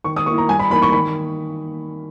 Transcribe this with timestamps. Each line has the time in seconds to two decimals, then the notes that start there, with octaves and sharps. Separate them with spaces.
0.04 D#3 C#6
0.16 D#6
0.26 A#3 E4 C#6
0.38 A#5
0.49 G2 G#5
0.59 B5
0.70 E3 A#3 D#4 B5
0.82 C#6
0.92 D#3 B5